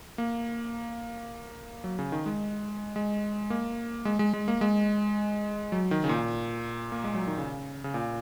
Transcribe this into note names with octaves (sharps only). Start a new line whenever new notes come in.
A#3
F#3
C#3
D#3
G#3
G#3
A#3
G#3
G#3
G#3
A#3
G#3
F#3
D#3
C#3
A#2
A#3
G#3
F#3
D#3
C#3
C#3
A#2